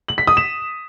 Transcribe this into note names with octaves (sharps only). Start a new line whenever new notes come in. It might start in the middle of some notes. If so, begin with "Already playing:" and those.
F#7
B6
D#6
E7